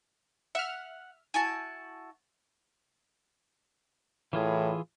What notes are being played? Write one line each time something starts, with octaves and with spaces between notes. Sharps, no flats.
E5 F#5 F6
E4 F#4 G#5 A5
A2 E3 F4 G#4